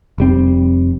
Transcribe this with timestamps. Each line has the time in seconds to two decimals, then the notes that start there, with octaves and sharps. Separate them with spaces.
0.18 F1 G3 C4